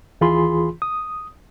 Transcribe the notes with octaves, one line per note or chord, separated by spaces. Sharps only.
D#2 E3 F4 G#4 B5 C6
D#6